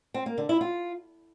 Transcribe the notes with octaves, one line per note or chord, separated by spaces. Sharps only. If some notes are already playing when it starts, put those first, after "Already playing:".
C4
A#3
D3
E4
F4